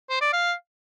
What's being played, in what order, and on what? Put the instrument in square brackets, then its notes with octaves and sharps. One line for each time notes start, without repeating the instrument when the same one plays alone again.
[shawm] C5
D5
F5